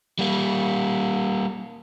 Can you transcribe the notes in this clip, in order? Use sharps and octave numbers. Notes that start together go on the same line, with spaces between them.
G3 A#3